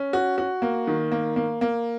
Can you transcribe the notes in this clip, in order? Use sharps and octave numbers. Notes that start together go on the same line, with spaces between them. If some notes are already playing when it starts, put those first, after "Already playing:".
Already playing: C#4
F#4
F#4
A#3
D#3
A#3
A#3
A#3